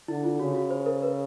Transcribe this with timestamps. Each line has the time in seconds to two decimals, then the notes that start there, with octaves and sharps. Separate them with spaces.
0.08 D3 E4
0.24 F4
0.39 C#3 F#4
0.55 F#4
0.70 C5
0.86 A#4
1.03 B4